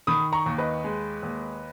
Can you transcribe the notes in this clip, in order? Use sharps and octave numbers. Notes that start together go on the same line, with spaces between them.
D#3 B5 D#6
A#5 C#6
D#2
B4 D#5
G#3
D#2